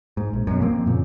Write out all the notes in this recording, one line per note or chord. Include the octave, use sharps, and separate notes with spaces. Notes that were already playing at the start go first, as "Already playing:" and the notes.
G#2
A#1
F#2 B2
F3 A#3 C4
F#2 A#2 C#3